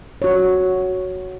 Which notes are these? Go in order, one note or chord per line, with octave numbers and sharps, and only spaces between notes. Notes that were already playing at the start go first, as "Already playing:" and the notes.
F#4 C#5